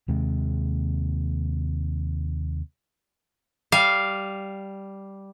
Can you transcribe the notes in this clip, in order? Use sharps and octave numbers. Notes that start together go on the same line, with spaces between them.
D#2 C3 G#3
G3 F5